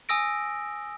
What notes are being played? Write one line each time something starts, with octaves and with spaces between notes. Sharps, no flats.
G#5 D#6 E6 A#6 D7